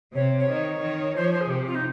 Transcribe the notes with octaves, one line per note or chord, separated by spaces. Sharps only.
C3 C#5
C#5
D#3
D#3
F3 C5
C#5
C5
G#4
C3 G4
F4
D#4